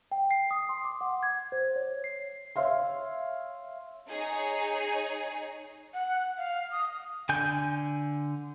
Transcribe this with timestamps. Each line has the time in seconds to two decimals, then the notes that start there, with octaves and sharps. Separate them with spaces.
0.12 G5
0.31 C7
0.51 D#6
0.69 C6
0.85 D6
1.01 F#5
1.23 G#6
1.52 C5
1.76 C#5
2.04 C7
2.56 C#5 E5 F5 C6
4.10 D#4 G#4 C#5
5.94 F#5
6.38 F5
6.71 D#6
7.29 D3 G#5 G6